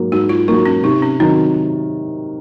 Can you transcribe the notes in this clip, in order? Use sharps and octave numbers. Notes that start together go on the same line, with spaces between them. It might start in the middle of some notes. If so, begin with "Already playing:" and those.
Already playing: G#2 F#3 A#3
G#2 F#4
F4
F#3 A#3 D#4
C#4
C3 D#4
C#4
D#3 F#3 C4